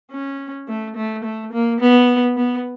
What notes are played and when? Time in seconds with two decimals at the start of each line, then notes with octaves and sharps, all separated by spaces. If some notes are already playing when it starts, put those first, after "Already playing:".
0.11 C#4
0.68 A3
0.96 A3
1.24 A3
1.52 A#3
1.80 B3
2.37 B3